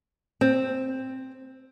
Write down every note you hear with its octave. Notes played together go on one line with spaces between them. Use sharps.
C4